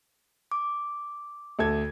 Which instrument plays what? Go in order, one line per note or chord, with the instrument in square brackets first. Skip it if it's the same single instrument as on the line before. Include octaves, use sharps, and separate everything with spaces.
[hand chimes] D6
[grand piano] D2 A4 G#6